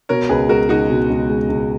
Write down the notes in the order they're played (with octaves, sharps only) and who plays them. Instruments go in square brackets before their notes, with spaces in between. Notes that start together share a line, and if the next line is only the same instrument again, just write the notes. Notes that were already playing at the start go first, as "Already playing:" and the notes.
[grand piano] B2 [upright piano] A#4 C#5
[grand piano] C#2 [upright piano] G#4 B4
[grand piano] G#3 [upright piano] F#4 A#4
[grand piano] C#2 [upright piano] D#4 F#4
[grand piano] B2
C#2
G#3
C#2